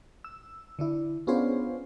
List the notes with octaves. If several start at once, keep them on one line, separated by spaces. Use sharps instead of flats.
E6
D3 D4 E4
B3 C#4 D4 F4 G#4 C5